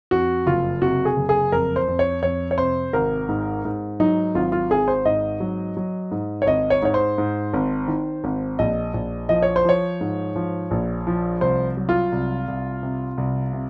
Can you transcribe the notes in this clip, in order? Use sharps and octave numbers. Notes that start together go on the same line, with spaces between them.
F2 F#4
F#1 F4
C3 F#4
G#4
F#1
G#4
F2 A#4
C5
F2
C#5
F2 C#5
C#5
C3 C5
G#1 A#4
G#2
G#2
F#3 D#4
G#1 F4
F4
G#1 G#4
C5
G#2 D#5
F#3
F#3
G#2
C#5
G#1 D#5
C#5
G#2 C#5
C5
G#2
G#1
D#3
G#1
A#1 D#5
A#1
F3 D#5
C#5
C5
F3 C#5
G#2
F3
A#1
F3
C2 C5
F#3
F4
C2
C2
C3
C2
C3